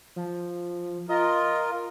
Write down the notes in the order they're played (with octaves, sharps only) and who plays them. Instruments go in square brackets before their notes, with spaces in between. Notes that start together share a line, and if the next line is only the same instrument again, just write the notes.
[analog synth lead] F3
[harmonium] F4 A#4 [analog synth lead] D#5